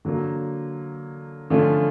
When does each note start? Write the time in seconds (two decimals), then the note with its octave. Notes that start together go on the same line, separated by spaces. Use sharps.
0.05 D3 F#3 A#3
1.50 D3 F3 A3 C#4 F4